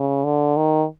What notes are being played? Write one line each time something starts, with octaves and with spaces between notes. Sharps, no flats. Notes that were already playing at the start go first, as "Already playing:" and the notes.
Already playing: C#3
D3
D#3